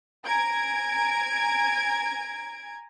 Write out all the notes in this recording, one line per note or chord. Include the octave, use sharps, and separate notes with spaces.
G#5 A#5 G#6 D7